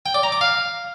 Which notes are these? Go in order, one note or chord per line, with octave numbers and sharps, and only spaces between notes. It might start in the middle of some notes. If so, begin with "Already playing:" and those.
G5
D5
A#5
D6
F5